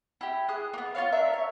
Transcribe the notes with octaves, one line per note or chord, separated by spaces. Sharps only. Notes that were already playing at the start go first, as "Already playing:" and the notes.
E4 G4
G#4 D#6 F#6
A#3 B3
F4 F#4 C#5 F5
D4 A#4 E5
C#5